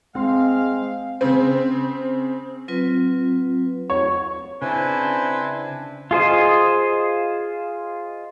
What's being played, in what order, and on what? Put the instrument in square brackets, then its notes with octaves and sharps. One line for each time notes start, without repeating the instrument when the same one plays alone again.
[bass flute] G#3 [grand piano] C4 C6 [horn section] F5
[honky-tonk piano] C#3 C4
[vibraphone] F#3 C4 F4 B4
[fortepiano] C#5
[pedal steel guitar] C#3 D4 [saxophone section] C4 E4 C5 [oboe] B4 [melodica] G#5
[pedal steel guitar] F4 G#4 C5 D#5